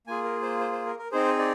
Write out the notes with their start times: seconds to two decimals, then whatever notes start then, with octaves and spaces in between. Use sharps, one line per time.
0.07 A#3 F4 G#4 G#5
0.24 A#4
0.42 C5
0.60 C5
0.72 C5
0.86 A#4
0.99 A#4
1.12 C4 D#4 G#4 C5
1.39 D5